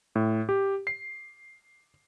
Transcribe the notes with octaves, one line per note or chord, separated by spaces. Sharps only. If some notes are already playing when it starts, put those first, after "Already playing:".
A2
G4
C7